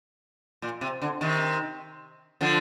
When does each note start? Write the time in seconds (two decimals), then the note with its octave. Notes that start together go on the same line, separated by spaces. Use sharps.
0.62 A#2
0.81 C3
1.02 D3
1.21 C3 D#3
2.41 D3 F3